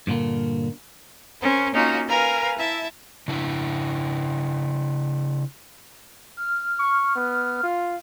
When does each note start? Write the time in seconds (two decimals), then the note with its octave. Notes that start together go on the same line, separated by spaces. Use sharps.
0.07 G2 A#2 D3 A#3
1.42 C#4 A#4 C5
1.73 A#3 C#4 D#4 F4 F#4
2.08 A#4 B4 F5 G#5 A#5
2.58 E4 E5 A5
3.28 C#3 D4 E4
6.37 F6
6.79 C#6
7.16 B3
7.63 F4